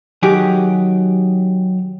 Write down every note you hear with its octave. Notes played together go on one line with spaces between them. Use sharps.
D#3 F#3 G4 G#4